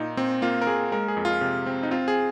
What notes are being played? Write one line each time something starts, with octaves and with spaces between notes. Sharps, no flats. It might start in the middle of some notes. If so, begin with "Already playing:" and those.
Already playing: A#2 D#4
A#2 C4
A#3 F4
A#4
A#3 G#4
G#3 A#4
G#4
F2
F4
C3
C4
D#4
C4 F4
G#4